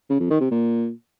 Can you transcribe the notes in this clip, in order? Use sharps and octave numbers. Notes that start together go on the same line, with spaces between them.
C#3
F2
D#3
C3
A#2